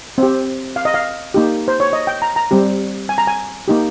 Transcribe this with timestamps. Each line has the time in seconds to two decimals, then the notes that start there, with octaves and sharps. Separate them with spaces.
0.18 C4 G4
0.76 F5
0.85 D#5
0.94 F5
1.34 A#3 D#4 G4
1.68 C5
1.80 C#5
1.93 D#5
2.07 G5
2.22 A#5
2.36 A#5
2.51 G3 C4 G4
3.09 G#5
3.18 A#5
3.27 G#5
3.68 A#3 D#4 G4